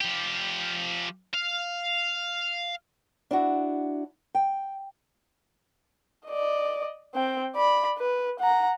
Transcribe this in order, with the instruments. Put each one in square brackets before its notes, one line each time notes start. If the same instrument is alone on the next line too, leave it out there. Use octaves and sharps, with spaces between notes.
[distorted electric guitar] F3 G4
F5
[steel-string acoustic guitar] D4 E4 F#4
G5
[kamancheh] D5 D#5
C4 G5
D5 B5
B4
F#5 A#5